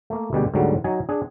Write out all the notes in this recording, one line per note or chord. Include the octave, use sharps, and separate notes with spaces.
A3 A#3
D2 B2 G3 G#3 G4 G#4
D2 G#2 D3 F#3 G3
F#3 D#4 G#5
D4 G#4